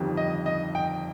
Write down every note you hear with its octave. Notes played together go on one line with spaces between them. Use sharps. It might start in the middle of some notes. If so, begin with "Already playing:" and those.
Already playing: G1 F2 D#3 G3
D#5
D#5
G5